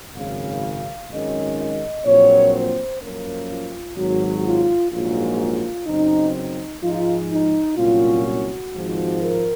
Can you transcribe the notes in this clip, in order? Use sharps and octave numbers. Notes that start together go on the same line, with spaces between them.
G#1 F#2 C#3 F5
G#1 F#2 D#3 G#3 C#4 D#5
D#5
A#1 A#2 F#3 C4 C#5
C5
F#2 F3 A#3 C#4 A#4
F4
G#1 G#2 F#3 F#4
F4
A#1 G#2 F#3 A#3 F4
F4
F#2 C#3 F#3 C4 D#4
D#4
G#2 F3 G#3 D#4 F4
D#4
C2 A#2 F#3 C#4 F4
F#4
G#1 G#2 F3
A#4